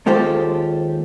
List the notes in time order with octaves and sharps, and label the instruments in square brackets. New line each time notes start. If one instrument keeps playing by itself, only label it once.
[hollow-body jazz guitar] D#2 G#3 F4 G4 A4 C5